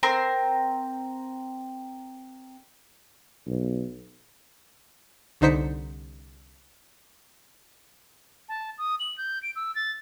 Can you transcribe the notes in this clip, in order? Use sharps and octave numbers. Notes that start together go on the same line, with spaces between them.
C4 A#4 C6
B1
C2 D3 D#4 C5 B6 C#7
A5
D#6
F#7
G6
D7
E6
A6